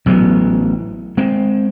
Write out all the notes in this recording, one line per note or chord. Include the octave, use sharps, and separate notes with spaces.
A1 F#3 G#3 B3
G#3 C4